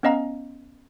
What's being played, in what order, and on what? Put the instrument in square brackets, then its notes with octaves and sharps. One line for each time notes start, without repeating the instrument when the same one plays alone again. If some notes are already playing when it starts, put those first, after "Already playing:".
[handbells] B3 C#4 D#5 F5 A#5